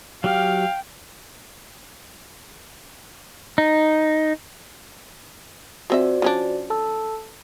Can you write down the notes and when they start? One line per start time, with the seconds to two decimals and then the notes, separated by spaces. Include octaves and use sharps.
0.24 F#3 G4 F5 G5 F6
3.58 D#4
5.90 F3 C4 F#4 C5 D5 E5
6.22 F3 C#4 D4
6.70 A4 A5 E6